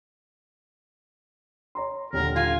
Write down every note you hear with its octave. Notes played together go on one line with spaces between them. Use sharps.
C#5 A#5 C6
D#1 D#2 D3 A#4
F4 G#5